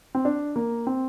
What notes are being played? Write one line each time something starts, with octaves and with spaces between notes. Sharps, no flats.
C4
D4
A#3
C4